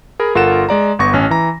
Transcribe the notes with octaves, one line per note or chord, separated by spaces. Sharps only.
G#4 A#4 B5
G1 F4 A4 A#4 F#5 E7
G#3 D5 A#5
G1 B3 C#6 A#6
A1 C#4
E3 A#5